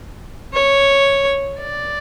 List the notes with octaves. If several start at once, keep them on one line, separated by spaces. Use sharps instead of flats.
C#5
D5